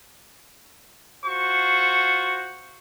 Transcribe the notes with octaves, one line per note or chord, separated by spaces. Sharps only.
F4 F#4 C5 C#6